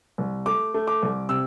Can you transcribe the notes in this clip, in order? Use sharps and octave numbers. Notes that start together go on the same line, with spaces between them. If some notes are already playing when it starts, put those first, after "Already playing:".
C2
A3 D6
A3
D6
C2
C3 E6